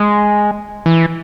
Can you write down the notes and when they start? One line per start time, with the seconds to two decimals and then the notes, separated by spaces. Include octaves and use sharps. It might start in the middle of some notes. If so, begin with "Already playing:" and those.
Already playing: G#3
0.86 E3